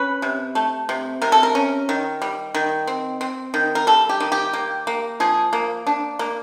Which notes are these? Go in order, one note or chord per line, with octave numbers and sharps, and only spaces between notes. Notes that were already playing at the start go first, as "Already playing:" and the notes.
Already playing: C#4 B4
C3
A3
C3
C3 A#4
A4
A#4
C#4
D#3
G3
D#3
C4
C4
D#3
A#4
G3 A4
G4
D#3
G4
A#3
A#3
F3 G#4
A#3
D4
A#3